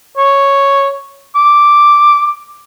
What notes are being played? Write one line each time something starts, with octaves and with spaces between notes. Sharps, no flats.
C#5
D6